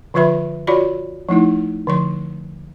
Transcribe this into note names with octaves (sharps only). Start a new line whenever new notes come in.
D3 F3 F4 B4 E5 B5
F4 F#4 C#5 D5 B5
F3 A3 D#4 E4
D3 F3 C6